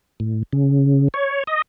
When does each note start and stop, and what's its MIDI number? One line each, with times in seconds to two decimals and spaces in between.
0.20 0.43 45
0.53 1.08 49
1.14 1.43 73
1.47 1.62 75